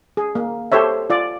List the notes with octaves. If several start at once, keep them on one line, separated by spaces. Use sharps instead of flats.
G#4
A#3
G4 A4 C5 C#5 E5
F4 D5